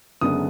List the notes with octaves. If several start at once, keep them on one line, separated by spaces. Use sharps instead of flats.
F#1 F#2 D3 G#3 B3 D#6